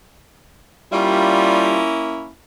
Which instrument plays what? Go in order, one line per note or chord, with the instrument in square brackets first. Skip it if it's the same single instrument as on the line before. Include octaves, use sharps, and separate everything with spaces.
[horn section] G3 F4 [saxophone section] A#3 C#4 E4